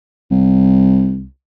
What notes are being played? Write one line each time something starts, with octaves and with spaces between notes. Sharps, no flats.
C2